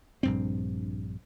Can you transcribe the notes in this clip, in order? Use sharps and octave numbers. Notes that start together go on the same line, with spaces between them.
A#1 G2 C4